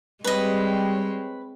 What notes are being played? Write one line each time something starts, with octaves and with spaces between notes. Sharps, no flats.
G3 G#3 C4 B4 C#5 D#5